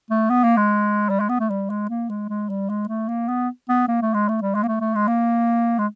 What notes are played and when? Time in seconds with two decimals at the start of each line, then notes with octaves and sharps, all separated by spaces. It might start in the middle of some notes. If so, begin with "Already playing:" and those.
0.10 A3
0.30 B3
0.43 A#3
0.57 G#3
1.09 G3
1.19 G#3
1.29 B3
1.40 A3
1.50 G3
1.70 G#3
1.89 A#3
2.09 G#3
2.29 G#3
2.49 G3
2.69 G#3
2.88 A3
3.08 A#3
3.28 B3
3.69 B3
3.88 A#3
4.02 A3
4.14 G#3
4.28 A3
4.41 G3
4.55 G#3
4.63 A#3
4.68 A3
4.80 A3
4.95 G#3
5.07 A#3
5.79 G#3